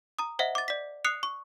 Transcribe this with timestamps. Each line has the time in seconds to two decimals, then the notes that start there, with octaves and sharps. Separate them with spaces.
0.19 A#5 D#6
0.39 C5 D#5 E5 F#5
0.55 D6 A6
0.68 D5 B6
1.04 D#6 F#6 C7 C#7 F7
1.23 C#6